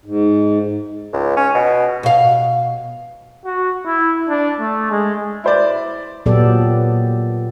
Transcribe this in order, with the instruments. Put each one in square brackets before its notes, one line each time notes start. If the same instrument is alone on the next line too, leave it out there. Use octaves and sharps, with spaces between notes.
[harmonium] G#2
[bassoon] C#2
C#4
B2
[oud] B2 F5
[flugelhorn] F#4
E4
D4
A3
G#3
[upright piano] E4 C5 D5
[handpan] A#2 F#3 B3 G4 A4 D5